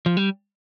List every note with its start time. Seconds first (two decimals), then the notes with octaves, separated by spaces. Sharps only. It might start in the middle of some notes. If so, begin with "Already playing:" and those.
0.06 F3
0.17 G3